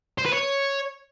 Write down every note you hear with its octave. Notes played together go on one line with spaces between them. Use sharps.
C5
B4
C#5